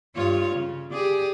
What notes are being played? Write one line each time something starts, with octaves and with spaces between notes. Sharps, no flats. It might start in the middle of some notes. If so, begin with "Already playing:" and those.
G2 F4 C#5
C#3
G4 G#4 D5